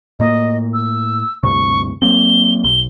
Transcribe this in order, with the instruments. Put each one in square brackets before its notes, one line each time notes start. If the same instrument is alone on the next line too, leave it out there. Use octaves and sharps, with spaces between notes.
[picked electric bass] A2 A#3 [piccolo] D#5
[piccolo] E6
[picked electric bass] D2 G2 C3 [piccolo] C#6
[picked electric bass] F#3 A#3 C4 [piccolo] G7
[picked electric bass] B1 [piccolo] G7